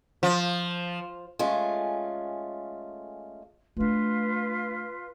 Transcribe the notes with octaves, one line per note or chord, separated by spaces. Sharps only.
F3
G#3 A3 C#4 F4
A3 D4 F4 B4